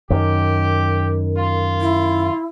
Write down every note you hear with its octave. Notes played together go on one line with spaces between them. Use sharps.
F#2 D#3 G4
F4
E4